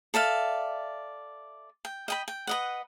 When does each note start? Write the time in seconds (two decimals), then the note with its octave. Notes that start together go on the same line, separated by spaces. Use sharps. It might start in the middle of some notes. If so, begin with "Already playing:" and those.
0.14 A4 D5 E5 F5
1.85 G5
2.08 D#5 G5 B5
2.28 G5
2.47 B4 D#5 F#5